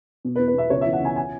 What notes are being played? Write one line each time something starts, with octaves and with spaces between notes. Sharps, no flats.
B2
B4
E2
B4
B2 E5
C#2 C#5
E3 E5
F#5
C#2 G#5
G#5